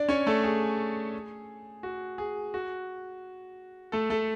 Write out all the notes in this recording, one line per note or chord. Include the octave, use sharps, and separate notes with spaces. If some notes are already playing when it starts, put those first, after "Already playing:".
Already playing: D4 D5
C#4 C#5
A3 A4
G#4
F#4
G#4
F#4
A3 A4
A3 A4